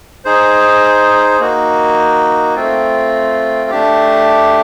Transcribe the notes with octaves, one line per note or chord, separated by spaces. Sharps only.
D#4 G#4 C5
A#3 D#4 F#4
A3 C4 F4
A3 D4 G4